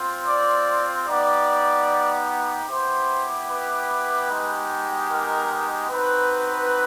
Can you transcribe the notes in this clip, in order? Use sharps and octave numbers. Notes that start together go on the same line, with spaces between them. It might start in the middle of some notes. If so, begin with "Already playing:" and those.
Already playing: C4 F4
D5
B3 D#4 G4 D5
B3 E4 G4 C5
B4
G#3 B3 D#4 G4
A#4
C4 D#4 F#4 B4